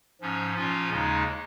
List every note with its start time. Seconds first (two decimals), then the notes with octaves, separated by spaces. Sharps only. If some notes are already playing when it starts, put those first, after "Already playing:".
0.21 G#2 F3 C#4
0.56 A#2 F3 C#4 F4
0.90 D#2 C#3 G#3 D#4